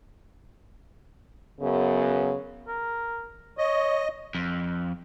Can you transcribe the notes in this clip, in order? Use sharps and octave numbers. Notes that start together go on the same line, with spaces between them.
F#2 C#3 B3
A#4
C#5 D#5
F2